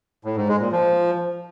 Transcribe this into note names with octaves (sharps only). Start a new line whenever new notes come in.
A2
G#2
G#3
A#2
F3